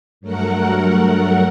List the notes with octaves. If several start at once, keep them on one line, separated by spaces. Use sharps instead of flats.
G2 F#3 A3 A#4 F#5